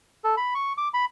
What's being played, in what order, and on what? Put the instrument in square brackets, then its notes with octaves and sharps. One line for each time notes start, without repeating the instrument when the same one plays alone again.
[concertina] A4
B5
C#6
D6
B5